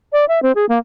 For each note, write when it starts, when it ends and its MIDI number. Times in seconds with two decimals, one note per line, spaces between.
0.13 0.25 74
0.28 0.42 76
0.42 0.52 60
0.55 0.66 68
0.69 0.78 58